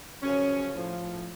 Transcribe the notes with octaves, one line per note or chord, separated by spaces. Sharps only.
F#2 C#3 F3 C#4
A2 F3